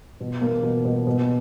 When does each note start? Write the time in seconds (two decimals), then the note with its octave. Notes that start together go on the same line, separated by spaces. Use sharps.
0.20 B2
0.41 A#3
0.63 B2
0.85 B2
1.07 B2